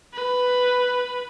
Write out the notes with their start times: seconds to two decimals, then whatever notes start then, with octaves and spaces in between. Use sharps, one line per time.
0.14 B4